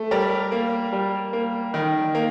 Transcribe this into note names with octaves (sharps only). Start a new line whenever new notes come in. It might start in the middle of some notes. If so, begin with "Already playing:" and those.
Already playing: A3
G3 A#4 D5
A#3
G3
A#3
D#3
A#3